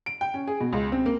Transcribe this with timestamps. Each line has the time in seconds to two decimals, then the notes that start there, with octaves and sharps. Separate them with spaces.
0.06 D7
0.21 G5
0.34 C#4
0.47 G#4
0.60 B2
0.73 C#2
0.92 C4
1.06 A#3